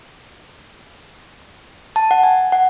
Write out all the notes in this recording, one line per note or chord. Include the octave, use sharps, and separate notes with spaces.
A5
F#5
G#5
F#5